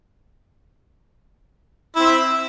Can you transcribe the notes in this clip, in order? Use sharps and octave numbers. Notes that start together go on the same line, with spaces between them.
C4 E4 E5